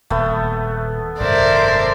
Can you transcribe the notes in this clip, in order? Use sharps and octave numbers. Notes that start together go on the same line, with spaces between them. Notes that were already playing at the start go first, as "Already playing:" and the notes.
D#1 A3 B3
G#1 F#2 C3 A#4 C5 D5 E5